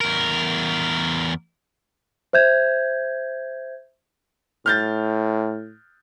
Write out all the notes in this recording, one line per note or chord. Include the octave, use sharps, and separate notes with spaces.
E2 A#4
C5 E5 G6 G#6
A2 F6 G6 A6